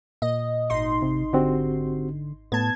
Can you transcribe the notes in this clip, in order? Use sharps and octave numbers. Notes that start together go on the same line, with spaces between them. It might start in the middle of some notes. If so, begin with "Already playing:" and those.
A#2 D#5
G#1 D#4 C6
C3
D3 C4 F#4 G4
A2 B3 A5 G#6